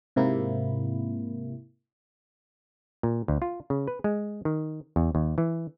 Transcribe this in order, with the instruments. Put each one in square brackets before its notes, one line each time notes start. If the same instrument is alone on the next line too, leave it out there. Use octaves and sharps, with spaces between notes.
[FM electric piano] G#2 C3 A#3 E4
[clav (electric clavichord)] A#2
D2
F4
C#3
B4
G#3
D#3
E2
D#2
E3